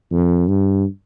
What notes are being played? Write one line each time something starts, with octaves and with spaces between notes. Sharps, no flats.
F2
G2